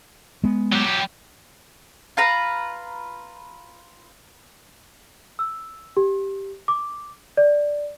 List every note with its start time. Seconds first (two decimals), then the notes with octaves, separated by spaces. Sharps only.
0.44 G#3 B3
0.72 F#3 G4
2.17 F4 B4 A#5
5.39 E6
5.97 G4
6.68 D6
7.37 D5